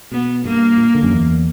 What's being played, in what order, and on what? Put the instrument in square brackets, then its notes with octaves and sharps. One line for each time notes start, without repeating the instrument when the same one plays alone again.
[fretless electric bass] B2 [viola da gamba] B3
[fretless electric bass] G2 [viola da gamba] A#3
[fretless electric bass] A#2
D3
F#2
E2